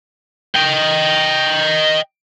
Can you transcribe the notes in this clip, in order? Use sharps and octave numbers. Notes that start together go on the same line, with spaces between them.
D#5 G5